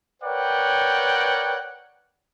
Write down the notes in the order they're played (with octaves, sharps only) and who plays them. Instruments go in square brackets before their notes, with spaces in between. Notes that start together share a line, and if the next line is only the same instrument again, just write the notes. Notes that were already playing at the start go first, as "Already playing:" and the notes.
[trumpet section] A#4 B4 C#5 D5 F#5 G5